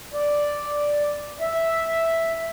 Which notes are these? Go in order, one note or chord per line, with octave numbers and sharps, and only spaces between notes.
D5
E5